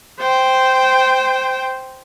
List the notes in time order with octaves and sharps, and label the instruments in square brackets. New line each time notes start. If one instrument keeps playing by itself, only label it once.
[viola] C5 G5